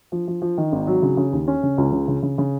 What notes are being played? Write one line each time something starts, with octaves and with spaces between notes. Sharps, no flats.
F3
F3
F3
D#3
G#1
F#3
C#3
C#3
D#2
C#4
C#3
C#2
C#3
C#3
C#3
C#3